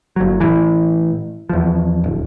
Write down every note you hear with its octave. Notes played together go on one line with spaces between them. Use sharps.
G1 F#3
A2 E3
E2 F3
D1